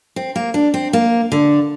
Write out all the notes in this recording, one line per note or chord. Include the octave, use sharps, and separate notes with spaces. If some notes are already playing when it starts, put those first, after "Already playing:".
C4
A#3
D4
C4
A#3
D3